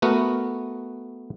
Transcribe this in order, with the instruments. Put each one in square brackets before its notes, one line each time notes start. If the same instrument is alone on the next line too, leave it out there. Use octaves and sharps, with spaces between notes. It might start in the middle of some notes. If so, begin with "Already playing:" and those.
[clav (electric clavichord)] A3 B3 F#4 A#4